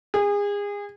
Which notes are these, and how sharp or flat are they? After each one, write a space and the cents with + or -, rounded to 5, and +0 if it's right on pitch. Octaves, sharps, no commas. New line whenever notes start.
G#4 -30